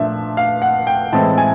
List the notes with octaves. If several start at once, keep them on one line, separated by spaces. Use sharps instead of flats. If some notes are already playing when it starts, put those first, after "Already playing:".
Already playing: A#2 F3 A3 D4 E5
F5
F#5
G5
A2 E3 G#3 C4 E4 A5
G#5